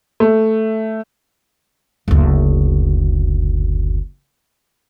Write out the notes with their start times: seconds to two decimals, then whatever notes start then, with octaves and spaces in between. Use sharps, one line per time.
0.20 A3
2.08 F#1 D2